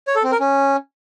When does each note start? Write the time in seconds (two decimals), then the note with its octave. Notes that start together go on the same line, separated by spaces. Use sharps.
0.07 C#5
0.16 A4
0.24 C4
0.32 A#4
0.40 C#4